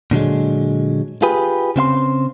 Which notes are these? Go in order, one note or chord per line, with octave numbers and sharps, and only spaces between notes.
A#2 D3 F#3 G#3
F4 G4 G#4 B4
C#3 C4 F5 C6